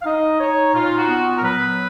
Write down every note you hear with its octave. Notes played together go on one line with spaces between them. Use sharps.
F5
D#4 D#5
D#4 C#5
A#2 F4
F#4
B3
A#4
F#3 B4